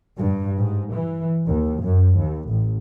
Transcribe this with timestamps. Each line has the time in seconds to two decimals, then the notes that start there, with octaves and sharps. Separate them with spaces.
0.18 G2
0.60 G#2
0.94 E3
1.46 D#2
1.82 F#2
2.19 D#2
2.49 A1